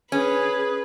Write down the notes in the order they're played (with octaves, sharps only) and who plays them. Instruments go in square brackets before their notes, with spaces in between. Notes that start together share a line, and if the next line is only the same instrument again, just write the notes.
[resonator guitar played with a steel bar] C#4 [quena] G#4 [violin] B4